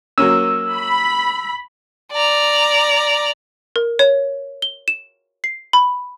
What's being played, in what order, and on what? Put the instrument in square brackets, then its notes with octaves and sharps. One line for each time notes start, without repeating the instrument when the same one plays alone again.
[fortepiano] F#3 A#3 C#4 [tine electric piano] E6
[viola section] B5
[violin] D5 A#5
[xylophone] A#4
C#5
G7
E7
C7
B5